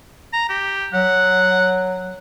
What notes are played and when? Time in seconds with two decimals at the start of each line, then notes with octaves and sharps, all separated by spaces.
0.33 A#5
0.49 G4
0.93 F#3 F#5